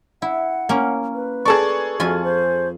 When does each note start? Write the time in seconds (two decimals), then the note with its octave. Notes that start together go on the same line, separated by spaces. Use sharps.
0.22 E4 F#5
0.69 A#3 C#4
1.14 B4
1.45 G#4 A4 D5 A5 A#5 C#6
2.00 F2 F4 F#4 G#5
2.24 C5